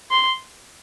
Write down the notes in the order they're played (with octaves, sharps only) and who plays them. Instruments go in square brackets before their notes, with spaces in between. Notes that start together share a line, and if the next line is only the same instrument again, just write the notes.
[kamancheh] C6